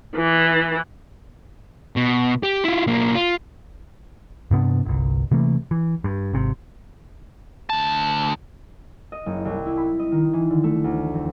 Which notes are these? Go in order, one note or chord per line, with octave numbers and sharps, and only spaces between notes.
E3
B2
G4
E4 F4
B1 A#3
F4
G2 C3 B3 D4
G1 C2
C3 E3 A3 A#3
E3
G2
G#1 C3
D2 A5
D#5
F#1
C2
E4
B5
D#5
D#3
E3
D3
A3
D2
F2